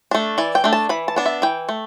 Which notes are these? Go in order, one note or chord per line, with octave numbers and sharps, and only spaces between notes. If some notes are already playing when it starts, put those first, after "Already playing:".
A3 D4
E3 D5
G5
A3 D4
A5
E3 B5
A5
B3 D4
E5
E3 G5
A3